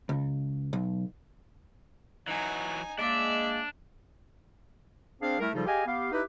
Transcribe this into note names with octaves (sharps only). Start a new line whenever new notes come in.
C#2
B1
E3 F#3 D#4 G#5
G#3 A#3 D4 D5 E5
C4 D4 G#4 C5 F5
G3 A3 E4 A#4
C#3 F3 G3 D#4 F4 A4
G4 G#4 D#5 F5 G#5
B3 G4 F5
D#4 E4 G4 B4